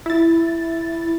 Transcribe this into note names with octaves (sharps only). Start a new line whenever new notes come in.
E4 A6